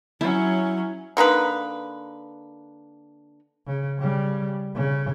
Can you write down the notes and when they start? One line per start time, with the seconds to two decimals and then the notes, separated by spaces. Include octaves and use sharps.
0.21 F#3 C#4 E4
1.17 D3 A#3 D#4 B4
3.67 C#3
3.99 C#3 G3
4.75 C#3